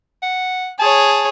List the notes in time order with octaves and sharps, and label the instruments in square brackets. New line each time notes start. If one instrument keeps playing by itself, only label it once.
[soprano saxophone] F#5
[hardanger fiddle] G#4 C#5 [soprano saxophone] A5